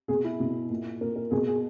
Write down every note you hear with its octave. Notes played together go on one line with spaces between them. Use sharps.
B2 G#4
E4
B2
A#2
A#2 A#4
A#4
B2 G#4
G#4